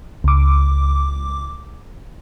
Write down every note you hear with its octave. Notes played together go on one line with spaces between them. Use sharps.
C#2 D6